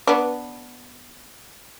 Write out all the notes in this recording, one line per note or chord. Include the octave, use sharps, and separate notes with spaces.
B3 D4